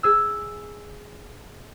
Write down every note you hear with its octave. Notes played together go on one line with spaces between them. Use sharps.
G#4 E6